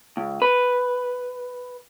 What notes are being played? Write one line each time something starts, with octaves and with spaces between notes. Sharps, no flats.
C#2
B4